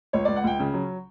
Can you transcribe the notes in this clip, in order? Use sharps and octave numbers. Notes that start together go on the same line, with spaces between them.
C#2 C#5
C#2 D5
F#5
C#2 G5
C#3
F#3